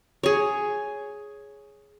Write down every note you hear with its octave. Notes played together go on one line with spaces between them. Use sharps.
G#4 C#5